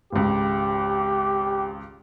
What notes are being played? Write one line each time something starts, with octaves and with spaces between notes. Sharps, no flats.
G#1 C#2 G4